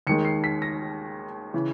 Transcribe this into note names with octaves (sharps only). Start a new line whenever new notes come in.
D#2 D#3 G#3 C#7
C7
B6
A#6
C#3 E3